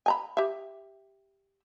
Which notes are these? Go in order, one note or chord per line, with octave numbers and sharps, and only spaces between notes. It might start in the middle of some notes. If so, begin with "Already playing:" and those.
G#5 A#5 B5
G4 E5